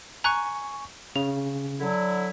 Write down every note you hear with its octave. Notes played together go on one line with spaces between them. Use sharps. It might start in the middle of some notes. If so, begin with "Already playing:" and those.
G#5 A#5 C#6 F#6
C#3 F7
D3 F#3 E4